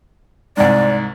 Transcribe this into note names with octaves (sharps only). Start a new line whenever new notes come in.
C2 G#2 D5